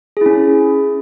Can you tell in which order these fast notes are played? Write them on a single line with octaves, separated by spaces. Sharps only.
G#4 E4 C#4